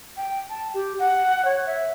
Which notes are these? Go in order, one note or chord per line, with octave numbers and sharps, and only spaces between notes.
G5
A5
G4
F#5
C#5
E5